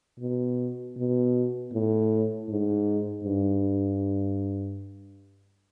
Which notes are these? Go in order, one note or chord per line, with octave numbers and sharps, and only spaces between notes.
B2
B2
A2
G#2
G2